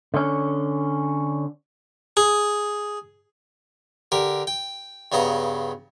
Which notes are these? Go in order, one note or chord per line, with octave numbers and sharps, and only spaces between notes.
D3 C#4
G#4
D3 G4 A#4
G5
G2 C#3 B3 D#5 A#5